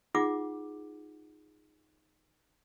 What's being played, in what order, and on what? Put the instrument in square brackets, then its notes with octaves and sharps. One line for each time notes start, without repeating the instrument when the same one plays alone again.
[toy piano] D#4 F4 G#4 F#5 D6